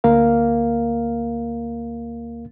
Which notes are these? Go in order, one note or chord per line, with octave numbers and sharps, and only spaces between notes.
D2 A#3 A#4 F5